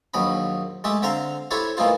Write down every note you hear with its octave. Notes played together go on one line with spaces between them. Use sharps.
A#1 D#2 F#3 D#5 B5
G#3 A3 G4 E5
D3 C4 E5 F5 A#5 C6
E4 G4 A4 C5 C#5
A#2 E3 A3 D#4 F4 C5